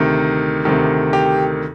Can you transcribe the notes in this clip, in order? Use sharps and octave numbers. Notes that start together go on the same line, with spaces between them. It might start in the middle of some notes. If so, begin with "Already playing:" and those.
Already playing: D2 C3 D#3
D2 C3 D#3
G4